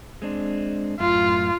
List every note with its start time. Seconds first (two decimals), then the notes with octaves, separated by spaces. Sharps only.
0.22 G#3 C4 D4
1.00 F#2 A2 F4 F5